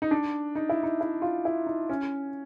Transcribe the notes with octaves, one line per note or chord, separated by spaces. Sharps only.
D#4
D4
D#4
E4
D#4
E4
F4
E4
D#4
C#4